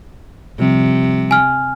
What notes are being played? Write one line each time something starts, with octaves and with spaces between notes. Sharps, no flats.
C3 F3 G3
G#5 F6